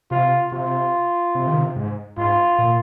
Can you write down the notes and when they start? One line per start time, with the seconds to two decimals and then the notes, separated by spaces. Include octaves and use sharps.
0.11 C3 F4
0.52 C3 F4
1.35 C3
1.47 D#3
1.58 C3
1.76 G#2
2.17 G#2 F4
2.58 A#2